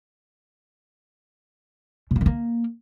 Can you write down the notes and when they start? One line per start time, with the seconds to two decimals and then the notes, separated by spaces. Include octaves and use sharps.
2.11 B2
2.16 A#3
2.21 D#3
2.26 A#3